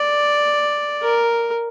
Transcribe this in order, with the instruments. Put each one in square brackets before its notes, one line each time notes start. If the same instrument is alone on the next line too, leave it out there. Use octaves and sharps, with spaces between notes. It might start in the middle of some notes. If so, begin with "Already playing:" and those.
Already playing: [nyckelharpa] D5
A#4